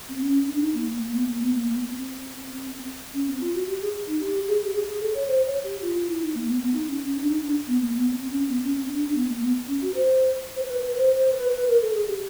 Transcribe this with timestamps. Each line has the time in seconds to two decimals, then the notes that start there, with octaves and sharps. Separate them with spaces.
0.09 C4
0.20 C#4
0.47 D4
0.60 D#4
0.75 A#3
0.87 A#3
1.01 A#3
1.14 B3
1.27 A#3
1.41 B3
1.54 A#3
1.72 B3
1.90 C4
3.14 C#4
3.27 C4
3.41 F4
3.54 F#4
3.67 G4
3.81 G#4
4.07 D#4
4.21 G4
4.48 G#4
4.64 G4
4.74 G#4
4.88 G#4
5.00 A4
5.14 C#5
5.28 C5
5.46 C#5
5.64 G4
5.82 F4
5.95 F4
6.07 E4
6.21 D#4
6.35 A#3
6.48 B3
6.61 B3
6.74 D#4
6.87 C#4
7.01 C#4
7.15 D4
7.28 D#4
7.41 D4
7.67 B3
7.81 A#3
7.95 B3
8.13 C4
8.30 C#4
8.48 B3
8.63 C#4
8.75 C4
8.88 D4
9.01 D4
9.15 B3
9.29 A#3
9.42 B3
9.67 C#4
9.82 F#4
9.95 C5
10.56 C5
10.62 B4
10.80 B4
10.97 C5
11.15 C5
11.33 B4
11.50 B4
11.68 A#4
11.82 A4
11.94 G#4
12.08 G4